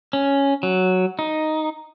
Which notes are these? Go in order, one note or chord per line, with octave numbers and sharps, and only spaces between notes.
C#4
F#3
D#4